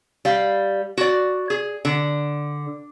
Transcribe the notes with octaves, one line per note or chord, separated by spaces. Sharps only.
G3 F5
F#4 D5
G#4
D3